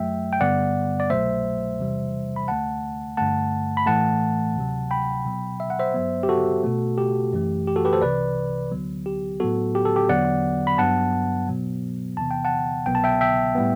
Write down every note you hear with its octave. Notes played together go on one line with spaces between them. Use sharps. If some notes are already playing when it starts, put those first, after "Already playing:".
Already playing: F#2 F#3 A3 E5 G5
G5
G2 D3 G3 B3 D5 F#5
D5
C2 B2 F#3 A3 C5 E5
E2 C3 E3 G3
B5
D2 D3 A3 F#5 A5
G2 D3 A3 F#5 A5
B5
A2 E3 A3 F#5 A5
D2 C3 F#3
G5 B5
B2 F#3 B3
E5
F#5
C5 E5
G2 F#3 B3
G4
F#4 A4
B2 A3
G4
F#2 E3 A3
G4
F#4 A4
G4 B4
A4 C5
C2 C3 E3 B4 D5
D2 D3 F#3 B3
G4
A2 F#3 B3 F#4 A4
G4
A4
G4
E2 D3 F#3 B3 D5 F#5
B5
G2 F#3 B3 F#5 A5
B2 F#3 B3
E2 C3 E3 B3 A5
G5
F#5 A5
C2 B2 F#3 B3 G5
A5
E5 G5
E5 G5
A2 G3 B3